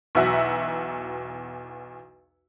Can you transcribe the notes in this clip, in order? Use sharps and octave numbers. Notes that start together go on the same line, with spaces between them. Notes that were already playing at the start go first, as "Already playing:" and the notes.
B1 E2 F#4 E5 F#5